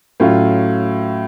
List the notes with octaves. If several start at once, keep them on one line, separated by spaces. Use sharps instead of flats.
A2 F#3 C#4 F4